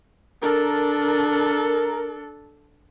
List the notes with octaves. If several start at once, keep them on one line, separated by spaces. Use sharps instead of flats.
D4 A4 A#4